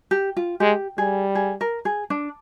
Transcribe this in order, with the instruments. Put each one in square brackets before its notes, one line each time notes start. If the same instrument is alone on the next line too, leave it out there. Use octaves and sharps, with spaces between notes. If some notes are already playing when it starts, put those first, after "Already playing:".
[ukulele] G4
F4
[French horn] G#3 [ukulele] G4
[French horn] G3 [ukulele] G#4
[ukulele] G#4
A#4
G#4
D4